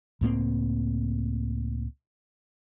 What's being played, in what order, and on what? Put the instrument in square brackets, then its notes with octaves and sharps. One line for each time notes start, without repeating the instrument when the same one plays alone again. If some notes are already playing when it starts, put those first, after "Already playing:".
[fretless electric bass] C#2 A2 A#3 C4